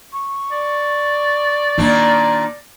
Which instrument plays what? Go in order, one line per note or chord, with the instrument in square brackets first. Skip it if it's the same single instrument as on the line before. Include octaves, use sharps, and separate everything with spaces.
[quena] C#6
[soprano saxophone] D5
[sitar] A#2 D#3 D4 [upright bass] A#3